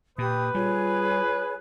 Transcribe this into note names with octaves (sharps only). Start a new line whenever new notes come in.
A#2 G4 B4 D#6
G3 F4 G#4 C#5 G#5